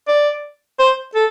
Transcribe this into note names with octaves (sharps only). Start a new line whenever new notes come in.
D5
C5
A4